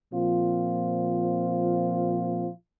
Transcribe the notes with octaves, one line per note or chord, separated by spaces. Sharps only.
A#2 F3 C4 F4